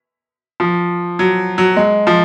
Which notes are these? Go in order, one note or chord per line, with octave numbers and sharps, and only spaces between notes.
F3
F#3
F#3
G#3
F3